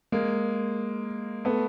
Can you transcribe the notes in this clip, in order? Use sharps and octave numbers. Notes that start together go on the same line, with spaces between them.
G#3 A#3
A3 B3